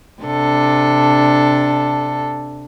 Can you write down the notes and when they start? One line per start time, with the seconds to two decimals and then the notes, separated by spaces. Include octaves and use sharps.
0.23 C3 D4 A4